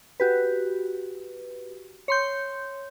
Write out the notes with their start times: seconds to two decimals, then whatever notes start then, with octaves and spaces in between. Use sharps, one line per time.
0.20 F#4 G4 B4
2.08 C#5 C6 G6